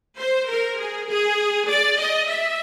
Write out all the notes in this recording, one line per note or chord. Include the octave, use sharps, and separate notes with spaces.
C5
A#4
G#4
G#4
D5
D#5
E5